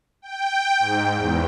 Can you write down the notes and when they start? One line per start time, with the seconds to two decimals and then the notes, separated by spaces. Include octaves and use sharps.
0.22 G5
0.79 G#2
1.15 E2